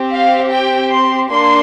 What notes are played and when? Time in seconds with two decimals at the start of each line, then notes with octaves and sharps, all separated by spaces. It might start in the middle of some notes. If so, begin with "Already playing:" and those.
Already playing: C4 G4
0.13 F5
0.53 G5
0.93 C6
1.32 A#3 D4 C6